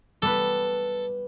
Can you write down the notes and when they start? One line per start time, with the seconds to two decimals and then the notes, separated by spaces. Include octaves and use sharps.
0.22 G3 B3 A4 B4